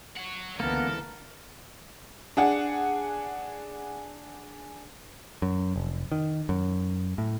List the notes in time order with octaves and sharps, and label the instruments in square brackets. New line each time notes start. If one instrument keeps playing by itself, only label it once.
[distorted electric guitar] C#5 F#5
[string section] C#2 D3 E3 [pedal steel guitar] A#3 B3 [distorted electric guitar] A4 [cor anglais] A#4
[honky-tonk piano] D4 G#4 F#5
[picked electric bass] F#2
F1
D#3
F#2
A2